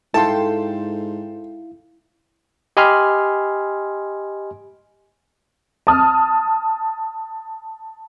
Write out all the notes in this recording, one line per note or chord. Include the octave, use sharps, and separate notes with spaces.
G#2 E4 A4 F5 G5 A5 C6
G4 D#5 G#5 B5 C6 F6
A5 D#6 F6